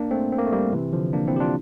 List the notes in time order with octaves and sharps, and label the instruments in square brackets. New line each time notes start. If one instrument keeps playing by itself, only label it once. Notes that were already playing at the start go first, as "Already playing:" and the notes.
Already playing: [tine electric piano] A#3 D4
A3 C4
C4
A#3
A3
G3 A#3
C3 E3
D3 F3
A#3 D4
C4 E4
G4
D4 F4